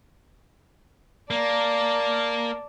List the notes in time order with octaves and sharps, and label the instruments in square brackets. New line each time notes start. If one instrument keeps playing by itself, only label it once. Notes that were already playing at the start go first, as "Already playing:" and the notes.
[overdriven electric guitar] A#3 [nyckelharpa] D5 A5